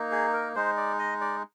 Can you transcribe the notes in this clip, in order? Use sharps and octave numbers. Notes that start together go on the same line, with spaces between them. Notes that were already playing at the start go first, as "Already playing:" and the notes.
Already playing: A#3 D#4
G#4
A#4
G#3 D#4 C5
D5
D#5
D5